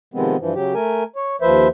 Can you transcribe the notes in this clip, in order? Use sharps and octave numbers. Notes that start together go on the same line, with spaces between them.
C3 D#3 F3 G#3 B3 C4
G2 E3 F3
C#3 F#3 G4
A3 A#4 G#5
C#5
D#2 F3 B4 C5 E5